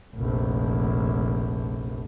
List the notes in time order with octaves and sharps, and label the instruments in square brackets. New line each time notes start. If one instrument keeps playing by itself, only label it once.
[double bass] F1 A#1